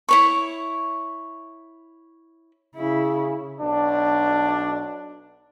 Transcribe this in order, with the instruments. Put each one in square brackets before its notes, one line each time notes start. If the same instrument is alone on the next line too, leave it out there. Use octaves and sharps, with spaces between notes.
[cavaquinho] E4 C#5 C#6
[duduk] C#3 [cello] E4
[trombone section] B1 D4